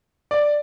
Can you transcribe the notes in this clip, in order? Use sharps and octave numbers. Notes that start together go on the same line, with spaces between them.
D5